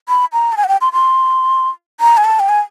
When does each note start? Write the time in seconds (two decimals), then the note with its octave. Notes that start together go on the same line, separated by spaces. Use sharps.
0.09 B5
0.33 A#5
0.52 A5
0.57 G#5
0.64 F#5
0.68 G5
0.81 C6
0.93 C6
2.00 A#5
2.17 G#5
2.24 A5
2.39 G5
2.49 G#5